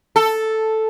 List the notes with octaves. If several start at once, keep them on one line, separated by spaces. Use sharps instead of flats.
A4